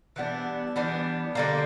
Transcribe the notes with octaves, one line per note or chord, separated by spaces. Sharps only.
E3 G3 B3 D4
E3 G3 B3 D4
D3 G3 A#3